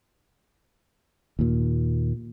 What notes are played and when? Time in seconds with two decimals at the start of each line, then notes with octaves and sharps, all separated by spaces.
1.39 D#2 A#2